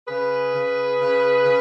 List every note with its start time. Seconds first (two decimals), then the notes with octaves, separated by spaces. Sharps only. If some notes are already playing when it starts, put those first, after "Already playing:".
0.07 C#3 G#4 B4
0.53 C#3
0.98 C#3
1.44 C#3